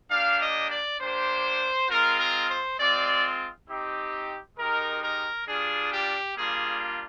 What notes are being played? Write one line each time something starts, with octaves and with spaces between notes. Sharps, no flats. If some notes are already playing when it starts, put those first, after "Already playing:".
A#3 D4 G4 F5
D#5
D5
A#3 D4 G4 C5
G#3 C4 F4 A#4
A#4
C5
G#3 C4 F4 D5
C4 D#4 G4
G#3 D#4 G4 A#4
A#4
G3 D4 F4 G#4
G4
G3 A#3 D4 F4 G#4